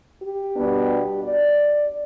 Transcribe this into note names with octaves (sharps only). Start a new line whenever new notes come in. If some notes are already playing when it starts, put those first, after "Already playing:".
G4
B2 G3 B3 D4
D5